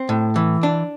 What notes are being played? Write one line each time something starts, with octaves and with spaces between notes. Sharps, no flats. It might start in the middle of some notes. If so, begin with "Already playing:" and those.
Already playing: C4
A2
E3
D4